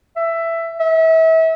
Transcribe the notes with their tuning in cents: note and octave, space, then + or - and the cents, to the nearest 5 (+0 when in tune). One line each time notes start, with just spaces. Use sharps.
E5 +15
E5 -30